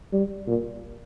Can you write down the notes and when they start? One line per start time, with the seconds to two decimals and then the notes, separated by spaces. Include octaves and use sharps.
0.13 G3
0.47 A#2